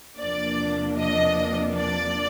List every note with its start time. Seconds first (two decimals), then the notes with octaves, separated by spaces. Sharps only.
0.19 E2 C3 F3 A#3 D4 D5
0.98 D#5
1.76 D5